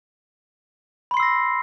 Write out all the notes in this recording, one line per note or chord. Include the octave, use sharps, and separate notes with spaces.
B5 C6 E6 A#6 C7